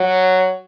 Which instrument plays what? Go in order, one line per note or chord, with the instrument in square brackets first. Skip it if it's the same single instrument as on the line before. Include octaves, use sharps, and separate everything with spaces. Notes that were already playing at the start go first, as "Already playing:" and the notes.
Already playing: [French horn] F#3